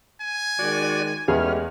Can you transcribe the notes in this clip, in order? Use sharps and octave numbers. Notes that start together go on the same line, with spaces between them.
G#5
D#3 G#3 F#4 D5
E2 G#3 A3 B3 C#4 G4 G#4 F6